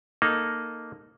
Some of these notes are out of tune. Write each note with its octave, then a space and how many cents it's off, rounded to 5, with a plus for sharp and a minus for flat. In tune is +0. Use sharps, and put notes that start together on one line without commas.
A#3 +0 D#4 -5 A4 +0